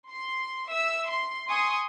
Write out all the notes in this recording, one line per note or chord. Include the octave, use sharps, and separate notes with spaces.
C6
E5 E6
C6
G#5 C6 C#6 D#6